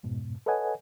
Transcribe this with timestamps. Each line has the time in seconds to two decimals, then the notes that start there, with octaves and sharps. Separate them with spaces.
0.03 F2 G#2 B2
0.46 A4 B4 C#5 D#5 F#5 G#5